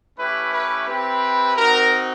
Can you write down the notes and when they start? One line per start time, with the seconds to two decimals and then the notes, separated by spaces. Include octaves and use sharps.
0.19 A3 C#4 E4 G4 B4
0.54 B4
0.88 C4 E4 G4 B4
1.56 C4 D#4 F#4 A#4